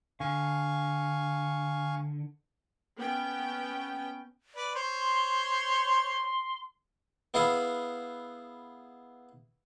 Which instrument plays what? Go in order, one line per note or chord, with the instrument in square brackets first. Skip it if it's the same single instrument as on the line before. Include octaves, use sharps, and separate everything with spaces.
[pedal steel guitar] D3 [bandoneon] F5 G#5 C#6
[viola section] B3 C#4 G5
[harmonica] B4 D5
[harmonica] C5 C#5 [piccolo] C6
[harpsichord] B3 E4 G#4 F5 F#5